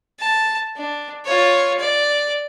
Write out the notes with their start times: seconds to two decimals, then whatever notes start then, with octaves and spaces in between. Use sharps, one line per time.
0.20 A5
0.77 D4
1.25 F4 C#5
1.79 D5